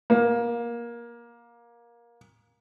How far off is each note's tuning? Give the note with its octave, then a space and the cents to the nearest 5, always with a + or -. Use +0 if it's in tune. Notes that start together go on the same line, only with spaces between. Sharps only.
A#3 +20